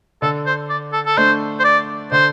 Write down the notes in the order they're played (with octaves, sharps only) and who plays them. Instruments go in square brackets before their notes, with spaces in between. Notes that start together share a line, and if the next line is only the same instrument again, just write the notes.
[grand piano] D3 [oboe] A4
[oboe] C5
D5
A4
A4
[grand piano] A3 D4 [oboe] C5
[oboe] C5
D5
[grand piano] D3 [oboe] C5